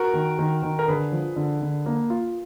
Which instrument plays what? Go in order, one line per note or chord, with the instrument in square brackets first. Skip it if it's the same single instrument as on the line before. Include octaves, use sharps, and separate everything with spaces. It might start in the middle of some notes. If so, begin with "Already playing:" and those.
Already playing: [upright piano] F#4 A#4
[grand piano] D#3
D#3
D#3
[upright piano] A#4
[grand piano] D3 [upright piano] G#4 B4
[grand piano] F3
D3
D3
A#3
F4